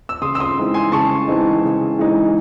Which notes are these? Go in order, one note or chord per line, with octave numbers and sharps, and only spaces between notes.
E6
C#3 C6 D#6
E6
C6 D#6
E3 G#3 C4 D#4
G#5 C6
C#3 A5 C#6
E3 G#3 C4 D#4
C#3
E3 G#3 C4 D#4